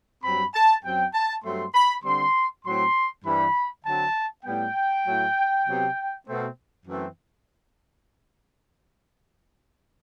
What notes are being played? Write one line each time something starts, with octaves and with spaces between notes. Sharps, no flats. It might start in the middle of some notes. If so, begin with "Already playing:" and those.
G2 F#3 C4 B5
A5
F#2 F#3 C4 G5
A5
G2 F#3 A3 C4 C6
B5
D3 G3 C4 C6
A2 F#3 C4 C6
G2 E3 G3 C4 B5
D3 F#3 C4 A5
A2 G3 B3 G5
A2 F#3 A3
C3 F#3 B3
B2 A3 C4
F#2 E3 A3 C4